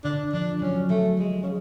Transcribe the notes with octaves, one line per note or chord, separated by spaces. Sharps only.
D3 D4
F3 D4
F#3 C#4
F#3 A3
G#3
C#3